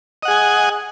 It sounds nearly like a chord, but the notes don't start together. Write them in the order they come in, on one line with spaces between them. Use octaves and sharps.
D#5 F#5 G#4 G#5